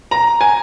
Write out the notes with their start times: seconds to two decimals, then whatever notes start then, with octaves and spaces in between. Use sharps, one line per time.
0.11 A#5
0.41 G#5